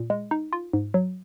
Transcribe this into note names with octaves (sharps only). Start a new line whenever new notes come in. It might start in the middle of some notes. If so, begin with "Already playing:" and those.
Already playing: A#2
G#3
D#4
F4
G#2
F#3